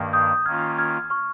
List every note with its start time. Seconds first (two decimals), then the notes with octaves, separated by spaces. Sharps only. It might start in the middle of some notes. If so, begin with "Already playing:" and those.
Already playing: G2 D#3 A#3
0.13 D#6 G6
0.46 D#3 A#3 C#4 F4 F6 G#6
0.78 F6 G#6
1.10 C#6 F6